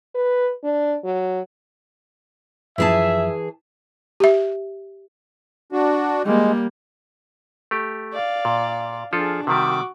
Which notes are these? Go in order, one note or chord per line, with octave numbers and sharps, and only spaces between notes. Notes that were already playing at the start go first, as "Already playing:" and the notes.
B4
D4
F#3
F#2 E3 F3 G#4 E5 A5
G4 E5
D4 F#4
G3 G#3 A#3
A3 G4
D5 F5
A#2
F3 D4 F4 G#4 A4
C3 D#3 G3 F#4 D6